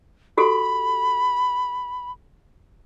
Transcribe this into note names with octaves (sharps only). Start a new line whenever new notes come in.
F#4 G4 A4 B5